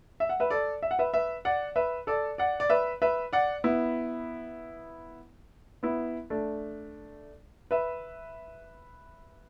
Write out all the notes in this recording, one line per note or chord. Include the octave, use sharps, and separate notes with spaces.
E5
F#5
B4 E5
A4 D5
E5
F#5
B4 E5
B4 E5
D5 F#5
B4 E5
A4 D5
D5 F#5
D5
B4 E5
B4 E5
D5 F#5
B3 E4
B3 E4
A3 D4
B4 E5